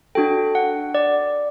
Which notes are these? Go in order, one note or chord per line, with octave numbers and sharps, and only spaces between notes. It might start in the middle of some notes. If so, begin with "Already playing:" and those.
D4 F#4 A4 G5
F#5
D5